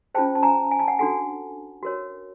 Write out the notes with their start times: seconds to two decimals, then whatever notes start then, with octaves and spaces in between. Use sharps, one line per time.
0.15 C#4 F4 G#4 C5 G5 A5
0.35 A5
0.43 G#5 A#5
0.71 G#5
0.79 A5
0.88 F#5 G#5
0.99 D4 F#4 A4 F#5 G#5
1.83 F#4 A#4 C#5